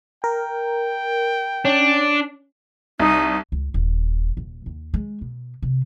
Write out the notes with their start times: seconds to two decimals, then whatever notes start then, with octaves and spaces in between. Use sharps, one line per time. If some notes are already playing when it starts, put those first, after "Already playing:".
0.24 A#4 G5
1.65 C#4 D4
2.99 C2 D#4
3.52 C#2
3.74 D#1
4.37 D#1
4.66 D#2
4.94 G#3
5.21 B2
5.62 C3